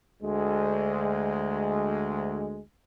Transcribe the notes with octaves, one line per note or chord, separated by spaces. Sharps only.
D2 G#3